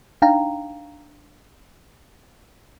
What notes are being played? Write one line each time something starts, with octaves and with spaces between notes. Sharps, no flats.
D4 D#4 F5 G5 A#5